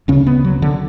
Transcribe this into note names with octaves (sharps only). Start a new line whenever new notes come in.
D2 C#3 C#4
B3
F#3
D3